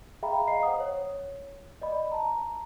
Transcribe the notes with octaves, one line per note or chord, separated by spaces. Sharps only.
G#4 E5 F5 G5 A#5 B5
D#5 F5 A#5 C7
C5 F#5 D#6
C#5
D5 D#5 B5
A5 A#5